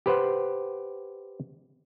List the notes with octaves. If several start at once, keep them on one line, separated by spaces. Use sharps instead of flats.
G4 B4 C5 F#5